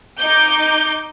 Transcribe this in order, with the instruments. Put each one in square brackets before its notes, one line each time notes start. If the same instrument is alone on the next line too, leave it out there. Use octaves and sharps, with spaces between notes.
[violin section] D#4 D6 G6